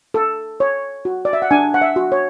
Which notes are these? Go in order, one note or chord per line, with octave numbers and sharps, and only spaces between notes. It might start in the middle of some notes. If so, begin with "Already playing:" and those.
A4
C#5
F#4
D5
E5
F#5
D4 G#5
F#5
E5
F#4
C#5